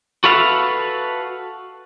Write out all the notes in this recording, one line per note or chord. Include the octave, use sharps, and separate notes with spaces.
F#4 A4 B4 E5 F5